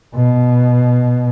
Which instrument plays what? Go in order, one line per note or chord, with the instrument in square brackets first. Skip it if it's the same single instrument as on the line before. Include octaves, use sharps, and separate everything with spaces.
[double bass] B2